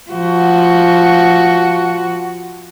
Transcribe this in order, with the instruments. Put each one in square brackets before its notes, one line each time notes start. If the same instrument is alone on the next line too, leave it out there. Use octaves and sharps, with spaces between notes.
[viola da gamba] F3 F#4